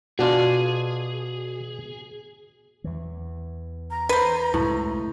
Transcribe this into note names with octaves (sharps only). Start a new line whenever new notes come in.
B2 D4 F4 F#4 G#4
E2 E3
A#5
B4 C5
C#2 F#2 A2 C3